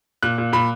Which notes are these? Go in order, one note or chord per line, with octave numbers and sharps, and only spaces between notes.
A#2 F#6
A#2
A#2 B5